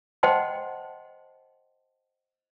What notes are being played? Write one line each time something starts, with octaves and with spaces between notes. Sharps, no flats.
C5 D#5 F#5 G5 A5 C6